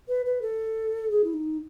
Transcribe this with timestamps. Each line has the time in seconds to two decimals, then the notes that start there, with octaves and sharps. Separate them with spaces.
0.08 B4
0.26 B4
0.42 A4
1.11 G#4
1.24 E4
1.34 D#4